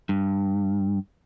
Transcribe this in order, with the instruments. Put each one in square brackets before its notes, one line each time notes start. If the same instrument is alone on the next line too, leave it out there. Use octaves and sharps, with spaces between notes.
[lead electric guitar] G2